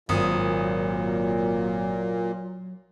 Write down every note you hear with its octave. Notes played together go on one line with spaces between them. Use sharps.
G#1 A#2 F#3 D#6